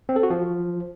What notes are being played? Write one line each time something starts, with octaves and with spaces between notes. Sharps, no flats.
C4
A4
F#4
F3